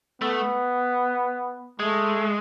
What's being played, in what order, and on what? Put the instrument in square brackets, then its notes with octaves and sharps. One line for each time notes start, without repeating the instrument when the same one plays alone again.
[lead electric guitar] A3 [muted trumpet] B3
[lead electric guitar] G#3 [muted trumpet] A3